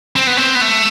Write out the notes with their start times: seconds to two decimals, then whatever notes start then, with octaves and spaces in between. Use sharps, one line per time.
0.16 C4
0.27 B3
0.37 C4
0.55 B3
0.61 A3